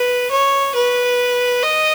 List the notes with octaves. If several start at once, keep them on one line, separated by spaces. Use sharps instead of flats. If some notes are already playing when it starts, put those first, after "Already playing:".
Already playing: B4
C#5
B4
D#5